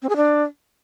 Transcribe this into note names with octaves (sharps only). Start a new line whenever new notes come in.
C4
G#4
D4